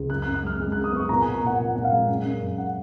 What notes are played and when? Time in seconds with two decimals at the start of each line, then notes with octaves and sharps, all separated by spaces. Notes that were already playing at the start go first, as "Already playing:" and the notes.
Already playing: C#2
0.10 F#2 F#6
0.22 F#6
0.26 F#2
0.34 F#6
0.43 G#3 F6
0.60 G#3
0.72 F#6
0.76 F#2
0.84 D#6
0.92 B3 C#6
1.09 A#2 A#5
1.22 G#5
1.26 A#2
1.34 A#5
1.43 A#2 F#5
1.59 A#2 F#5
1.75 A#2 F#5
1.84 F5
1.92 G#3
2.09 F#2
2.25 F#2
2.42 F#2
2.58 F#5